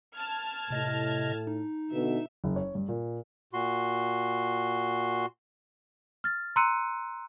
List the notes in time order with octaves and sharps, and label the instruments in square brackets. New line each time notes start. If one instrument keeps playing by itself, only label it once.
[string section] A5 F6 G#6
[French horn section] A2 [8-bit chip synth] C3 D#5 A#6
[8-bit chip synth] D#4
[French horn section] B2 D3 [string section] E5
[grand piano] F#1
C#5
G2
A#2
[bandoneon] A#2 F#4 C6
[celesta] F6 A6
A#5 C6 E6 F#6 C#7 D#7